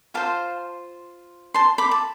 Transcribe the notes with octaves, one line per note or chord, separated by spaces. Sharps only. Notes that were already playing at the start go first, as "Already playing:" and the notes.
F4 C5 F5 A5
A5 C6
B5 D6
A5